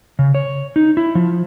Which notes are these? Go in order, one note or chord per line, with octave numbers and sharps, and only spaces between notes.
C#3
C#5
D#4
E4
F3